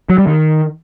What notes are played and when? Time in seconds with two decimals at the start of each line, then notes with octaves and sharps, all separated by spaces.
0.10 F#3
0.18 G3
0.27 D#3